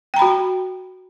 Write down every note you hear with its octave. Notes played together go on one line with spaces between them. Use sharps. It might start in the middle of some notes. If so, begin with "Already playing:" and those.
F#4 G5 A#5 B5